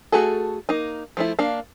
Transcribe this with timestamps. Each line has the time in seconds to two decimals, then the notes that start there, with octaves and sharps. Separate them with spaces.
0.12 A3 F#4 G#4 A4
0.69 A#3 D#4
1.17 F3 A3 E4
1.39 A#3 D4 F5